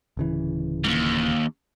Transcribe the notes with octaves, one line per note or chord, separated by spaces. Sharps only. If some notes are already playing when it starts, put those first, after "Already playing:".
D1 C#3 E3
D#2 G#2